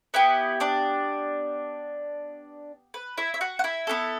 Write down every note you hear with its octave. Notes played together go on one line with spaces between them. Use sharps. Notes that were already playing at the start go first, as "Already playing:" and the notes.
B3 E4 G4 B4
D4 D5
B4
E4 E5
E5
F#4 F#5
F#5
E4 E5
B3 F#4 A4